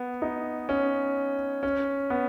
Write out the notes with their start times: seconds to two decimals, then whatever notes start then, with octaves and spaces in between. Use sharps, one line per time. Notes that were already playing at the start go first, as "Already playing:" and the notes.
Already playing: B3
0.22 D#4
0.69 C#4
1.63 C#4
2.10 B3